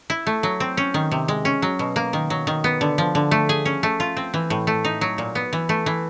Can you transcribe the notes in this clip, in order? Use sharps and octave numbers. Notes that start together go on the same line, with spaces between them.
E4
A3
F#3
C4
C#4
D#3
C3
G#3
C#4
F#3
B2
A#3
D#3
F#3
D#3
B3
D3
F3
D3
A3
G#4
C#4
A3
F4
C4
E3
A2
A3
D#4
F#3
A#2
B3
E3
A3
E3